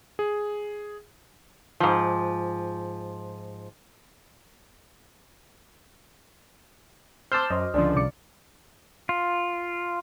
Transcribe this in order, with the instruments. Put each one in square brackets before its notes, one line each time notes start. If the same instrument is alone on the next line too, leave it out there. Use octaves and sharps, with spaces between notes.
[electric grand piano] G#4
[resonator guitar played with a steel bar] G#2 F3
[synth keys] C5 C6 [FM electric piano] A5 E6 G6 [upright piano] D6 F6
[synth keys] F#2 [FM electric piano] C5 D#5
[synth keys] C#2 D3 F3 [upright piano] D4
[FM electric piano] C2 D5 C#7
[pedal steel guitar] F4